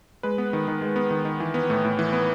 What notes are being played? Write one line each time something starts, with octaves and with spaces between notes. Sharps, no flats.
G#3 B4
B3
D#3
D#3
G#3
B3
D#3
D#3
E3
B3
A2
A2
E3
B3